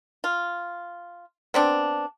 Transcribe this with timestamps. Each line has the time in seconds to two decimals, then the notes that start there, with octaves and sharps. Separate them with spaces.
0.24 F4
1.54 B3 C4 D4